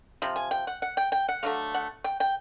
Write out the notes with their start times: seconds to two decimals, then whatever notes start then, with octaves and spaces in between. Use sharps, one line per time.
0.22 C3 F3
0.36 G#5
0.51 G5
0.67 F#5
0.82 F#5
0.97 G5
1.12 G5
1.29 F#5
1.43 D3 F#3 A3 F5
1.75 F#5
2.04 G5
2.20 G5